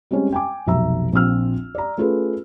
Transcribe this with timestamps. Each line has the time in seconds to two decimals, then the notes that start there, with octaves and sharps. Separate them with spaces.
0.11 G3 G#3 C4 C#4
0.33 G5 G#5 D6
0.66 F1 B1 E5 A#5 E6
1.13 A#1 F3 C4 E6 F6
1.75 D5 A#5
1.98 A3 C#4 F4 G#4 A4 B4